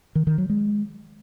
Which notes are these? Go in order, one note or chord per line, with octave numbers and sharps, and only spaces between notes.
D#3
D#3
F#3
G#3